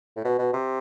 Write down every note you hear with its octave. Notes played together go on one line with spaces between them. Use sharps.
A2
B2
B2
C3